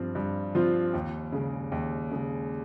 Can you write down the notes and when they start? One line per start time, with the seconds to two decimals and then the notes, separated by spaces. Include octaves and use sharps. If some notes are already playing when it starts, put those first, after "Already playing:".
Already playing: G2 F3 C4 F4
0.15 G2
0.55 F3 C4 F4
0.94 D#2
1.32 C#3 G#3
1.72 D#2
2.11 C#3 G#3